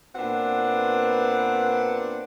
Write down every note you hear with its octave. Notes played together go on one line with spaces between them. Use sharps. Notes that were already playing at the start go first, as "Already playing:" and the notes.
A#2 B3 C4 D4 B4 F#5